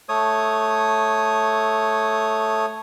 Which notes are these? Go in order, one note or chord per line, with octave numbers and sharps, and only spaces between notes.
A3 C#5 D#6